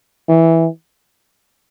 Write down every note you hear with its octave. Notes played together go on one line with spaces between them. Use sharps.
E3